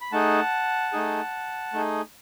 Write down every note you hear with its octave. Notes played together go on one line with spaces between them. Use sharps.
B5
A3 D#4 G#4 F#5 A5
A3 D#4 G#4
A3 D#4 G#4